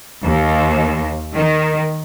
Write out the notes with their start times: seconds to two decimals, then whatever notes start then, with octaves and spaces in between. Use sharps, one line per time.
0.24 D#2
1.34 D#3